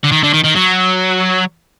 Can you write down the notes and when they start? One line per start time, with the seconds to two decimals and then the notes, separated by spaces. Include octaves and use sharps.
0.04 D3
0.12 D#3
0.23 D3
0.34 D#3
0.44 D#3
0.56 F#3